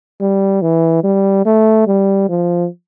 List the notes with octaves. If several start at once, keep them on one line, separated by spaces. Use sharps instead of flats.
G3
E3
G3
A3
G3
F3